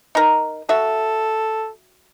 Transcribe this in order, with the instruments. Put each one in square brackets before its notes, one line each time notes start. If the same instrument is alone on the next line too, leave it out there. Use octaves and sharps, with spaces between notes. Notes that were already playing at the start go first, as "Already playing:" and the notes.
[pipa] D#4 A#4
[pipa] F#4 E5 [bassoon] A4